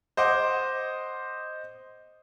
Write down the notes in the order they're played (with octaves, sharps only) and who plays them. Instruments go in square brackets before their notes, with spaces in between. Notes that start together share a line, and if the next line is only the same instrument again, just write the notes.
[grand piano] C5 D#5 F#5 D6